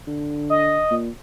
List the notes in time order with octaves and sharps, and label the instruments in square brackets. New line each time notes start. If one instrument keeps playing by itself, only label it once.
[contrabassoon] D3
[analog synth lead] D#5
[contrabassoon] A#2